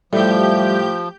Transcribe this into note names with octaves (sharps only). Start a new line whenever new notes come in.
A2 F3 G3 G4 E5 G6